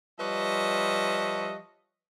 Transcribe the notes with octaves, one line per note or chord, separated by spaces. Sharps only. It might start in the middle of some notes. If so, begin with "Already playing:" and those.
F3 G3 B4 C#5 D#5 E5